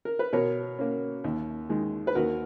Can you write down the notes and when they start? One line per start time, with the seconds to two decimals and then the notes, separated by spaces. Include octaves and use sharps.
0.05 A#4
0.19 B4
0.33 B2 A#4 C#5
0.79 A#3 C#4
1.24 D#2
1.69 D#3 G#3
2.07 B4
2.15 D#2 F#4 A#4